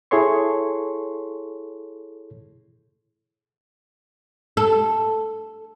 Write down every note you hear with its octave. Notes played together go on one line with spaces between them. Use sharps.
E4 G#4 A4 C#5 C6 C#6
A4